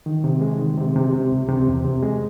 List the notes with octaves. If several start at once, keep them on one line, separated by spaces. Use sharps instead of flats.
D#3
C3
G#3
D#3
C3
C3
C3
C#2
C3
E2
C3
G#3